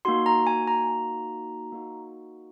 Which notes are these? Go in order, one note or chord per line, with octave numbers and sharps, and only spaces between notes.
A#3 D#4 F#4 C6
A#5
G#5
A#5
A#3 D#4 F#4